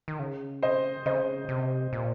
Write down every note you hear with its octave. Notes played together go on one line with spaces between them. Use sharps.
D#3
C#3
C5 D#5
C#3 C5 D#5
C3
A#2